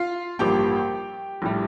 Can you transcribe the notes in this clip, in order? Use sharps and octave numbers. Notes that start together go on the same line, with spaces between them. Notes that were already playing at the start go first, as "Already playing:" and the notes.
Already playing: F4 F5
A1 G2 F3 A#3 G4 G5
A#1 A2 G3